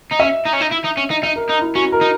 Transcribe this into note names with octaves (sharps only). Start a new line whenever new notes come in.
D#4
C#4 E5
D#4
C#4
D#4
E4
D#4
C#4
D#4
D#4 E5
A#4
D#4
E4
C#4 F#4
A#4
D#4